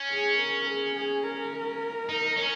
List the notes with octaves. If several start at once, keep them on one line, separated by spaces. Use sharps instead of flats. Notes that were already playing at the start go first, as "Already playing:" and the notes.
Already playing: C#4
G#4
A#4
G#4
G#4
A#4
D#4
C#4